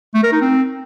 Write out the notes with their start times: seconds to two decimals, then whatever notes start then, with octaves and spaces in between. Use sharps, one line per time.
0.15 A3
0.23 A#4
0.32 D#4
0.41 C4